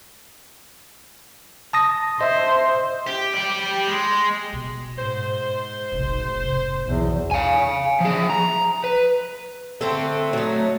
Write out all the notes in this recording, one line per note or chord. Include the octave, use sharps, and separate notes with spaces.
A5 D#6 A#6
C5 D#5 E5
G4
G4 D5
G#3
B2
G#2 C5
F1 B1
G#2 C3
B1 E2
F5 G#5
F3 G#4
A#5
B4
D3 A3 C4 A4
F#3 A3 D#4